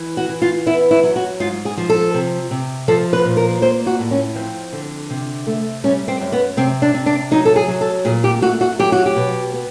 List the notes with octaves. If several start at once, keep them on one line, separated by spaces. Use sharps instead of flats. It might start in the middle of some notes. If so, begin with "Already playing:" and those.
Already playing: E3
F#4
E3
F4
B3 E4
E4
F#3
F#4
G#2 F4
G#4
F3
A4
C3
C3
F3 A4
B4
A#2
A#4
A#3 C5
F#4
A2
C#4
F2 C4
D3
C3
A3
G3 C#4
C4
F#2
B3
C3 C4
D4
C3
D4
F#3 D#4
A4
G#4
F#3
A4
A#2 G#4
G4
A3 F#4
F#4
F#3 G4
F#4
G4
B2
B3